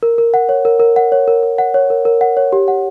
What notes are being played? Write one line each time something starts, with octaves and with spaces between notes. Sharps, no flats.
A#4
A#4
F#5
C#5
A#4
A#4
F#5
C#5
A#4
A#4
F#5
C#5
A#4
A#4
F#5
C#5
G4
F#5